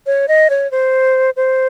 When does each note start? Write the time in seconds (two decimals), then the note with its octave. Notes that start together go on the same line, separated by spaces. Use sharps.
0.07 C#5
0.28 D#5
0.50 C#5
0.71 C5
1.37 C5